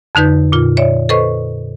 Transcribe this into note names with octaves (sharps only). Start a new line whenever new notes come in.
F2 D3 D#4 B4 G6
A#2 F4
C#5 D5 E5
A4 B4 C5 D#5 C#6